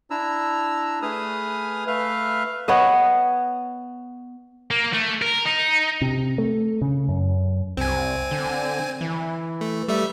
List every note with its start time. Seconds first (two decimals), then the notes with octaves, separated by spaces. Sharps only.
0.10 D4 E4 A#5 E6
1.02 A3 G#4 B4 G#5 D#6 F6
1.87 A3 B4 E5 F5 F6
2.68 B3 C#5 D#5 F5
4.71 A#3
4.93 A3
5.22 A#4
5.45 D#4
6.01 C3
6.38 A3
6.82 C#3
7.09 F#2
7.77 C2 C4 G#5
8.31 D3
9.01 E3
9.61 A3
9.88 G3 A3 E5